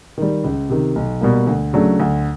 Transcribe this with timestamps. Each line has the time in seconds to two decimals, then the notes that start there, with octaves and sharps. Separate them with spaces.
0.18 D#3 G3
0.44 C#2
0.70 C3 D#3
0.96 B1
1.21 B2 G3 A#3
1.47 D2
1.73 C#3 F#3 A3 D4
2.00 D2